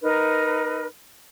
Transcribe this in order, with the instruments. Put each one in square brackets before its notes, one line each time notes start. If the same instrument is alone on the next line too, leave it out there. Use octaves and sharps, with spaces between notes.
[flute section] D#4 A#4 B4